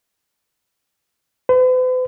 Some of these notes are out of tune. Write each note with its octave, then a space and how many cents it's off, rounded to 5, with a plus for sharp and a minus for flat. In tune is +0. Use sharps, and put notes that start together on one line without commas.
B4 +45